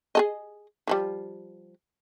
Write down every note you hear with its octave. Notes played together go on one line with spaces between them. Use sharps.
G#4 A4 D#5
E3 F3 G3